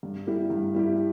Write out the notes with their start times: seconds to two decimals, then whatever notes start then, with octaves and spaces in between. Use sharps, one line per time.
0.03 G2
0.27 G3 E4 G4
0.50 G2
0.74 G3 E4 G4